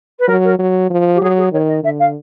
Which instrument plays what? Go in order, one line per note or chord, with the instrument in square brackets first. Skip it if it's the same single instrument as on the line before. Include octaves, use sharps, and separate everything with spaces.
[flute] B4
[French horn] F#3 [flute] A#4
[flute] A#4
[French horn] F#3
F3
[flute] G4
[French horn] F#3 [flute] G#4
[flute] G#4
[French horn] D#3 [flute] C#5
[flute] D#5
[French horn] D3 [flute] E5
[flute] F5